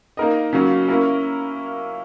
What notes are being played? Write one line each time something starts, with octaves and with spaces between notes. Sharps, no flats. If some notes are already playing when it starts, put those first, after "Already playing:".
A#3 D#4 A#4 D#5
C#3 F#3 A#3 C#4
A#3 C#4 E4 A#4